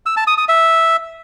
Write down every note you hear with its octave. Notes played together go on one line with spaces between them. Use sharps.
E6
A5
D#6
D#6
E5